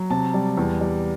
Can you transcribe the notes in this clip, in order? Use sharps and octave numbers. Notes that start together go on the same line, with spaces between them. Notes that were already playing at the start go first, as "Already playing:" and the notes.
Already playing: F#3
C3 A5
G3
E2
G3